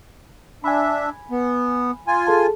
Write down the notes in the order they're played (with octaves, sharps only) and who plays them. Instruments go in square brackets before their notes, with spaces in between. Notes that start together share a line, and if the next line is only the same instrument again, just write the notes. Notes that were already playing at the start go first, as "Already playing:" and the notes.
[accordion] D4 E5 [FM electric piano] G#5 B5
[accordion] B3
F4 G#5
[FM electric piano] G#4 A4 A5